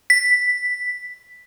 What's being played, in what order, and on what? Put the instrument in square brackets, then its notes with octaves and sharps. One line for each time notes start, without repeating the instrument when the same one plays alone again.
[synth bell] B6